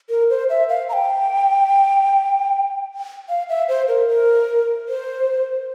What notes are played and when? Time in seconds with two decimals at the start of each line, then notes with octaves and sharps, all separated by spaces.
0.10 A#4
0.30 C5
0.50 E5
0.69 F5
0.89 A#5
0.93 G5
3.29 F5
3.49 E5
3.68 C5
3.88 A#4
4.09 A#4
4.88 C5